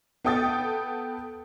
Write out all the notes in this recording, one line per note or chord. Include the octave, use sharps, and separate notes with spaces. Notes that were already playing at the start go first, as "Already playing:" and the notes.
B3 A4 G5 D#6 A6